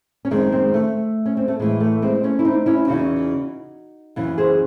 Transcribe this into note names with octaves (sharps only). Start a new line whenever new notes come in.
C#4
F#2 D#3 G#3 C4
G#3 C4
A3
C#4
C4
A3
A2 E3 G#3
A3
G#3 C4
A3 C#4
E4
C4 D#4
C#4 E4
E2 C#3 E3 D#4 F#4
F#2 C#3 E3
G#4 C5